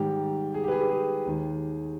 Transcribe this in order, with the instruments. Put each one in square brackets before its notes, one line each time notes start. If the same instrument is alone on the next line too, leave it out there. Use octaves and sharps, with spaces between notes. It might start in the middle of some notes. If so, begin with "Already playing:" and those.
Already playing: [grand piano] G#2 D#3 G3 G4
G#4
G4
B4
G#4
G4
G#4
D#2 D#3 G#3